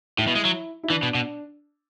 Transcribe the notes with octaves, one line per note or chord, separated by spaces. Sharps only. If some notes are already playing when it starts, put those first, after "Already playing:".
A2 E4
B2
G#3
F#3
E4
E3 D4
B2
B2